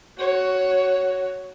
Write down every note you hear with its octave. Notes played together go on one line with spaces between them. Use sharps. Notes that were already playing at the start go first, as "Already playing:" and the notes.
F#4 C#5